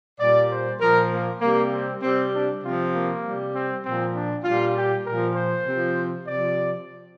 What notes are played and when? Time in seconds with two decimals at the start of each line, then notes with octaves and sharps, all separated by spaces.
0.20 A#2 G3 D5
0.51 C5
0.80 A#2 F3 A#4
1.11 A#3
1.41 C3 G3 A#3
1.71 C4
2.01 C3 G3 C4
2.33 D4
2.63 C3 F3 F4
2.94 A#3
3.23 C3 G3
3.54 C4
3.83 A#2 F3 C4
4.14 D4
4.44 A#2 G3 F4
4.74 G4
5.05 A#2 F3 A#4
5.36 C5
5.66 C3 F3
6.26 C3 F3 D5